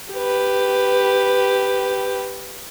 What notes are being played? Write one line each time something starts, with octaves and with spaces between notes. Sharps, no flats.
G4 B4